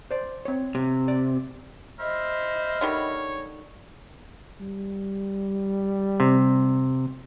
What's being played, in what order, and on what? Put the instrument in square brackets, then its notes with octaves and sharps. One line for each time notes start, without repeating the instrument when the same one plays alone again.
[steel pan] C5 D5
C4 C#5
[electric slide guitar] C3
[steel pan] D5
[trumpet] C5 [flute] D#5 [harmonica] E5 B5 F6
[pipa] D3 D#3 G3 [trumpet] C#5
[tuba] G3
[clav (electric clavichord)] C3